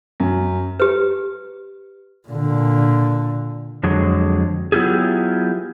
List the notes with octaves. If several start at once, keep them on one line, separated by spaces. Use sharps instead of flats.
F#2
G4 B4
A#2 D3
F2 D3 F#3 G#3
F#3 B3 E4 F4 G4 G#4